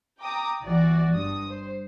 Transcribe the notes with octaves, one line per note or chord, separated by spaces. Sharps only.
G5 A#5 D6 D#6
G1 E3 F#4 D5
G2 D#6
C5